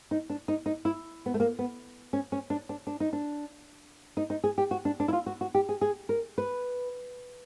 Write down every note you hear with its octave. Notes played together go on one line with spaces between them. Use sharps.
D#4
D4
D#4
D#4
E4
B3
A3
A#3
B3
C#4
C#4
D4
D4
D4
D#4
D4
D#4
D#4
G#4
G4
F#4
D4
D4
E4
F4
F#4
F#4
G4
G#4
G#4
A#4
B4